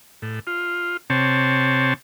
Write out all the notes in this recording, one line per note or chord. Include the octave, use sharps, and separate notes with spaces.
A2
F4
C3 C4 C#5 A5